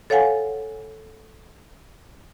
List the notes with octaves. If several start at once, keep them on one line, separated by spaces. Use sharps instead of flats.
A4 C#5 F5 F#5 G#5